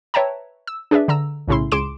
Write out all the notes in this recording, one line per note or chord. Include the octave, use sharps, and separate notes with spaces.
B4 C#5 E5 G5 A5 A#5
E6
D4 G#4 B4 D5 E5
D3 A#5 E6
B1 A2 C#3 C#4 E4 C6
C#2 G#4 C6 D6 D7 E7